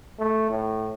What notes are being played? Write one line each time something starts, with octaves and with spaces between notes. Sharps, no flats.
A3
A2